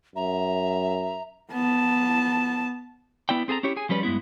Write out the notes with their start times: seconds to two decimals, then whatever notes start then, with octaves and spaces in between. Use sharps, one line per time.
0.15 F#2 E5 A#5
1.52 B3 A5
3.29 B3 E4 D5 G5
3.48 C4 G#4 A4 G#5 A#5
3.63 C#4 E4 G4 C#5
3.77 G#4 G#5
3.89 F3 G3 C#4 B4 D5
4.03 G2 G#3 B3 E4